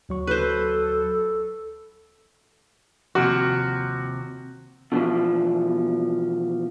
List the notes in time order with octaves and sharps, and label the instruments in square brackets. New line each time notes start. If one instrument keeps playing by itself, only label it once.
[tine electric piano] D2 F#3 C#6
[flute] A4 [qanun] B4 C5
[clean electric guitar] D#2 C3 F3 [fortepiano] F#4
[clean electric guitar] B2 D3 E3 F3